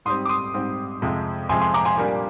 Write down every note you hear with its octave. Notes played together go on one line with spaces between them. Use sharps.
G#2 G3 C4 C6 D#6
D6
C6 D#6
G#2 G3 C4
F2 C3 F3 G#3
F2 C3 F3 G#3 G#5 C6
G#5 C6
A#5 D6
G#5 C6
A#2 G3 A#3 D4